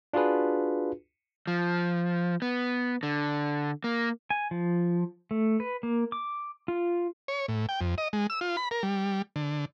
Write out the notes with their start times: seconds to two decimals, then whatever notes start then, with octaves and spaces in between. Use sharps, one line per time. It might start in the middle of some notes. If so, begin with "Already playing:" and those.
0.13 D4 F4 F#4 G#4 B4
1.47 F3
2.42 B3
3.03 D3
3.84 A#3
4.30 G#5
4.51 F3
5.31 A3
5.60 B4
5.83 A#3
6.12 D6
6.68 F4
7.28 C#5
7.48 A2
7.69 G5
7.81 F2
7.98 D#5
8.13 G#3
8.30 E6
8.41 F4
8.57 B5
8.71 A#4
8.83 G3
9.36 D3